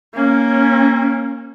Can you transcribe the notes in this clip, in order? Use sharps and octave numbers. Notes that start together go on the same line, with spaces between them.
A#3 C#4